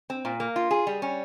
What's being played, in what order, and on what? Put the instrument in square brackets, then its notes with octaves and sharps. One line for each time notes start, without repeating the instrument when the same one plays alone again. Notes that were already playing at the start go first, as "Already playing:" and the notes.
[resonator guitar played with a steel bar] C4
A#2
A#3
F4
G#4
G3
C#4